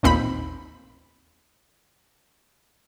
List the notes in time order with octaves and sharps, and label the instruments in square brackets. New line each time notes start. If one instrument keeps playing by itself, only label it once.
[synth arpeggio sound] A1 D#2 A#2 C4 D#4 B5